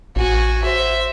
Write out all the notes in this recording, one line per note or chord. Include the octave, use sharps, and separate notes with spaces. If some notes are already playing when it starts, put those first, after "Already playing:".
A1 F#4 G#5
C5 E5